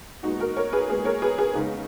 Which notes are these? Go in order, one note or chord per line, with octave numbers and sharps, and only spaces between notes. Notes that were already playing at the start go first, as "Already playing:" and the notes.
A#2 G#3 B3 D#4 F#4
F#4 A#4
A#4 C#5
G#4 B4
A#2 G#3 B3 G#4 B4
A#4 C#5
G#4 B4
G#4 B4
C#3 G#3 B3 D#4